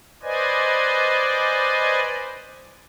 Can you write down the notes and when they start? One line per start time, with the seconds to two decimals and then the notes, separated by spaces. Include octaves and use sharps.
0.23 B4 C5 D5 D#5 G#5